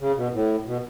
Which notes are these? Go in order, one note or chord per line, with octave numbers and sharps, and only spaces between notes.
C#3
B2
A2
B2